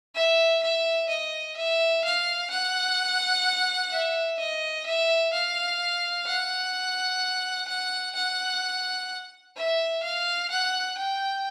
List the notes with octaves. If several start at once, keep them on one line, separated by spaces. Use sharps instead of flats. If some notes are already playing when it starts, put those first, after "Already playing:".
E5
E5
D#5
E5
F5
F#5
E5
D#5
E5
F5
F#5
F#5
F#5
E5
F5
F#5
G5